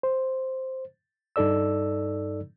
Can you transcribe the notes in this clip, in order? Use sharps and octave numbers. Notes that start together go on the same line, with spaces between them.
C5
G2 D#4 A4 D5 E6